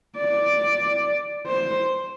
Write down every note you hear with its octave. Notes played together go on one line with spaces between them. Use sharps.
D5
C5